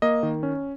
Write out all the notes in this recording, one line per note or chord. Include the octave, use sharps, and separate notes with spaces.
A#3 D#5
D#3
C#4